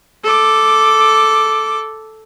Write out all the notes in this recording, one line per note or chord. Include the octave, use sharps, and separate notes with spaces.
A4 D6